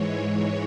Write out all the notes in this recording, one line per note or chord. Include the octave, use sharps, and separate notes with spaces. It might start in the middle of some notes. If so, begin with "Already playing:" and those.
Already playing: G#2 E3 G#3 C#5